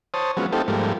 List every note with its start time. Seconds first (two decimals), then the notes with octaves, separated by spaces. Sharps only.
0.14 C5 C#5 A5 D#6
0.37 F3 F#3 G#3 B3 C#4
0.52 A3 C4 D#4 F4 G4 A4
0.68 G#2 F3 G3 A3 A#3